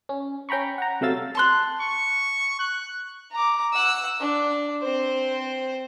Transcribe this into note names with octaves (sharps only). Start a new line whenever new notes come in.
C#4
C#4 G5 A#5 B5 C#6
F#5 A#5
C3 F#3 A3 F5 E6 A6
A5 C6 F#6
C#6
F#6
A#5 D6
F#5 E6
D4
C4 C5